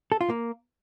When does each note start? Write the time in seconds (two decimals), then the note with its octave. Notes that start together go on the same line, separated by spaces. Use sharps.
0.12 A4
0.21 F4
0.30 A#3